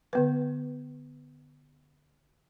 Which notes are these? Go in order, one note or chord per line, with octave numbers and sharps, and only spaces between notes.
D3 B3 B4